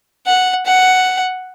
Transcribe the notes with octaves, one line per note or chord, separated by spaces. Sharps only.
F#5
F#5